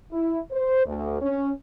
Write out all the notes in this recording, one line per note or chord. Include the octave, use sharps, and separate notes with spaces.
E4
C5
D2
C#4